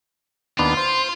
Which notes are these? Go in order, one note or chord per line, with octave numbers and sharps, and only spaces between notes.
D#2 B3 D4 F4
C5